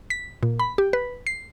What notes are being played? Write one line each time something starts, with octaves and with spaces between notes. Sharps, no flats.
B6
A#2
B5
G4
B4
C7